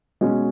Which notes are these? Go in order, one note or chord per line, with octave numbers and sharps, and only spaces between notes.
B2 G#3 C#4 F#4